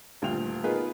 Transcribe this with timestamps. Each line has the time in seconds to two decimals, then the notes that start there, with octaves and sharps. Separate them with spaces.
0.22 D#1 D2 G2 F4 G5 F7
0.64 B3 D#4 F4 G#4 A#4 B4